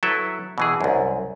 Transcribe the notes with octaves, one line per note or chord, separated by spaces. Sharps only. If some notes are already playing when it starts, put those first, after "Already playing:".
F#3 E4 A4 B4 E5
B2 E3 G#4
C2 F#2